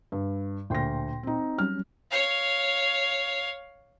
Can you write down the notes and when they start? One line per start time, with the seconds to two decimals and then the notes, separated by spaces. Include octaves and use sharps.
0.12 G2
0.70 D2 A#2 G5 C6 A#6
1.23 C4 D#4
1.58 F#3 G3 C#4 F6
2.11 C#5 F5